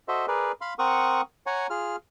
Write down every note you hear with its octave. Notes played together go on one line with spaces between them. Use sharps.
F#4 A4 C5 D#5 E5
G#4 A#4 B4 D5
F5 B5 C6
C4 A#4 F#5 C#6 D#6
C#5 F#5 G#5 A#5
F4 G#4 F6